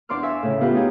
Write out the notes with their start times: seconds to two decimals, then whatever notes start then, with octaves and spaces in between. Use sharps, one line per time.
0.09 E2 D4 D5 C6 D6 F6
0.23 E5 F5 G#5 C#6 E6
0.43 A2 C#3
0.61 B3 F4 G4 B4
0.75 D#4 G#4 G5